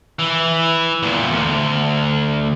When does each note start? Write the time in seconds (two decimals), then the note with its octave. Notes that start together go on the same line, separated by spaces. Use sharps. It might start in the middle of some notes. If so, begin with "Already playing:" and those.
0.19 E3
1.03 E2 A#2
1.30 D2